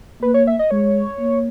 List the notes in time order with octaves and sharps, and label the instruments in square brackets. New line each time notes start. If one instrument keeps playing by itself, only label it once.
[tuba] A#3 [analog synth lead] B4
[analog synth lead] C#5
E5
D#5
[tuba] G#3 [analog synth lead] C#5
[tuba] A#3